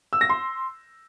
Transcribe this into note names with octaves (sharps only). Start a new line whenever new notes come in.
E6
A#6
C6